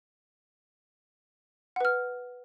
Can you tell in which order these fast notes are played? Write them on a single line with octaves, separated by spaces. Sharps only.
F#5 B4 F6